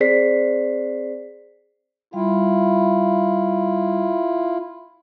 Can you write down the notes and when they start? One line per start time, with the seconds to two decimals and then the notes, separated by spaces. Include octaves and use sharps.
0.01 C4 G#4 C5 D5 B6 C7
2.13 G3 E4 F4 F5